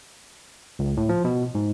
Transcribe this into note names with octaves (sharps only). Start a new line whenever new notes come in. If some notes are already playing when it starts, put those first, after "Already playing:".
C#2
A2
F3
B2
G#2